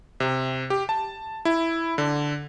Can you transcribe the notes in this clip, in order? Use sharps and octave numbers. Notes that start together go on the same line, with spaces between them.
C3
G4
A5
E4
D3